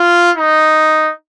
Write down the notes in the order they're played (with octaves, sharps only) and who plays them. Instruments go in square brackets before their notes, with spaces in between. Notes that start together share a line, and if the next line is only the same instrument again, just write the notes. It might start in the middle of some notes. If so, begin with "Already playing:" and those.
Already playing: [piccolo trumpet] F4
D#4